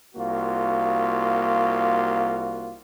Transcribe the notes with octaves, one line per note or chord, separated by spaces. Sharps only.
C2 A#3 F4 F#4